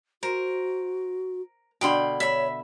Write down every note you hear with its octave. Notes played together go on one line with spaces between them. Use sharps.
F#4 A#4 C5
B2 D3 F5 G5 B5 C6
C#5 E5 B5